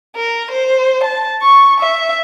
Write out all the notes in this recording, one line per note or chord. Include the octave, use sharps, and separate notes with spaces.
A#4
C5
A5
C#6
E5